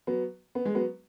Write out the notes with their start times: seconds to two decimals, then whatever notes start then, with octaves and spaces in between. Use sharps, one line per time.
0.07 F#3 B3
0.55 B3
0.65 G#3
0.75 F#3 B3